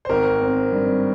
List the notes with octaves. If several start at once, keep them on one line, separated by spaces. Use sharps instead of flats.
C5
G#1 A#4
C4
G2